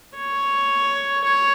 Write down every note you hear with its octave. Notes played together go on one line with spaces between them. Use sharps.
C#5
C#5